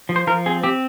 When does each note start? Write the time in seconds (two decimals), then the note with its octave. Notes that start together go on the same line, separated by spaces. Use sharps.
0.09 F3
0.16 C5
0.27 F3 A#4
0.46 C4 G#4
0.63 C4 G4